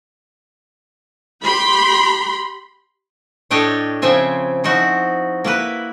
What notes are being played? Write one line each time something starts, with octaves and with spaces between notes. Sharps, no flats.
G4 B5 C6
A2 D4 G4 A4 C#5 D#5
C#3 F3 C4 E5 G#5
F3 D#4 E4 F#4
A#3 E4 B4